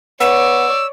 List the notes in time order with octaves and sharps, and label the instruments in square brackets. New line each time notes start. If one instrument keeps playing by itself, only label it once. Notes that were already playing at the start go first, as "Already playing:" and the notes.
[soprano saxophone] B3 [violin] C#5 D5 [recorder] E6